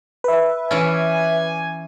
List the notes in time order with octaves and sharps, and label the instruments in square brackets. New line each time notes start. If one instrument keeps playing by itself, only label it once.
[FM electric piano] B4 E5
[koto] E3 C#4 [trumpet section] D5 G#5